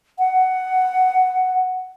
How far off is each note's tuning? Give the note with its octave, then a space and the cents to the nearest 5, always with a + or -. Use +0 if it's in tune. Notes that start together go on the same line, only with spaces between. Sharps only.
F#5 +10